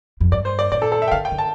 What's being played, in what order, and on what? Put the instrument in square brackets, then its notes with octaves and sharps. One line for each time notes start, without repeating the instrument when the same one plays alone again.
[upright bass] F2
[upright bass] G2 [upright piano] D5
[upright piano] C5
D5
[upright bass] A#2 [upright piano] D5
[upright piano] A4
A4
E5
G5
[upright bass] D3 [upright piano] F5
[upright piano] G5
[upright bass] D3
[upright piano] A5